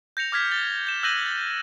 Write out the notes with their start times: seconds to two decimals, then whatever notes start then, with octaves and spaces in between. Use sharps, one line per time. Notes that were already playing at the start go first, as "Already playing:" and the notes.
0.17 G6 A#6 C#7 F7
0.32 D6 F6 G#6 B6
0.52 A6 G7
0.87 G6 E7
1.03 E6 F#6 G6 A#6 D#7 F#7
1.26 A6